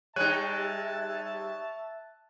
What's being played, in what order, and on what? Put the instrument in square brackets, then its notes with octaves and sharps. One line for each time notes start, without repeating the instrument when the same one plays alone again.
[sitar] G3 G#3 D#4 [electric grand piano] C#5 F#6 D#7 [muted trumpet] E5 [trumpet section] A5